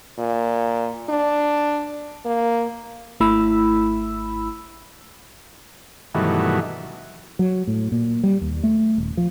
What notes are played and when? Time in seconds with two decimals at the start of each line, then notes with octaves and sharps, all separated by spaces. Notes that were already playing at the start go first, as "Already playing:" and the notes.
0.19 A#2
1.10 D4
2.26 A#3
3.20 G#1 A3 E4 B5 E6
6.14 G2 B2 D#3 E3 F#3 A3
7.39 F#3
7.67 A2
7.92 A#2
8.23 G3
8.41 D#2
8.63 A3
8.98 D#1
9.17 F3